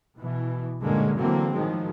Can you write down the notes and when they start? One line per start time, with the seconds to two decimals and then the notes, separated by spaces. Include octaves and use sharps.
0.17 B2 E3
0.81 G2 A#2 D3 G#3 A#3 C#4
1.16 D3 E3 F#3 A#3 C4
1.52 A2 D#3 F3 F#3 G#3